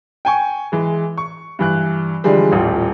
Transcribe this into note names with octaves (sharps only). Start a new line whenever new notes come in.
G5 G#5 C#6
E3 G#3
C#6
G2 E3 F#6
D3 E3 F3 G3 G#3
D#1 A1 F4 G4